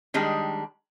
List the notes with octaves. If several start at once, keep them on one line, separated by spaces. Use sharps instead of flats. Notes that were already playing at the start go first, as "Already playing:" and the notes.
D#3 G3 G#3 D4